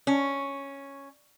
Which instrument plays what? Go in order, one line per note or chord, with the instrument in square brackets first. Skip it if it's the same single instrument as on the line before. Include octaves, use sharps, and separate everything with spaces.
[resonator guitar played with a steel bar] C#4